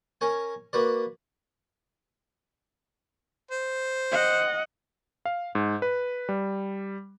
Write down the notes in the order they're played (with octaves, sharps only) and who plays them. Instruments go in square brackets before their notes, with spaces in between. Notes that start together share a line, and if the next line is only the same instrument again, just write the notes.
[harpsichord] C#4 A#4 C#5 G#5
A#3 F#4 B4 D5
[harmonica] C5
[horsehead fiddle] D#5 F#5
[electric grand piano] F5
G#2
B4
G3